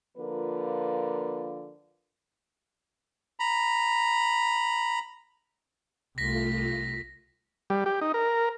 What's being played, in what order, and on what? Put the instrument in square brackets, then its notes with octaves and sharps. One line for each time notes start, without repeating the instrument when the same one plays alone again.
[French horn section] D3 F3 A#3 F4 A#4 B4
[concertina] A#5 B5
[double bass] C2 [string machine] A3 F4 [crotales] A#6 B6
[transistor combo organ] G3
G4
D#4
A#4